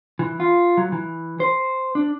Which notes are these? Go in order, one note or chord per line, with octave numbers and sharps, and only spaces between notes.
E3
F4
F#3
E3
C5
D4